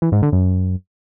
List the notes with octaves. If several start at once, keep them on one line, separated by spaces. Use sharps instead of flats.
E3
G#2
D3
F#2